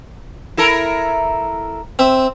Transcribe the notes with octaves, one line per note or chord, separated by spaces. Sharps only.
E4 A4 A#4
C4 E5